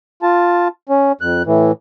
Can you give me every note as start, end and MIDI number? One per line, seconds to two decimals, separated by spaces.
0.23 0.68 65
0.23 0.68 81
0.89 1.12 61
1.21 1.43 41
1.21 1.43 90
1.46 1.72 45
1.46 1.72 52